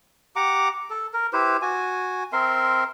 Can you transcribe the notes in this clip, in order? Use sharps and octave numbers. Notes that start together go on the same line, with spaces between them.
G4 F#5 A#5 D6
A4
A#4
E4 G4 B4 C5
F#4 G#5
C4 A#4 E5 C6